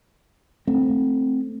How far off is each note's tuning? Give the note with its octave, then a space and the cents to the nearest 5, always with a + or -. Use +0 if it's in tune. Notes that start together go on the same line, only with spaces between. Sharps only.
A3 +0 C4 +0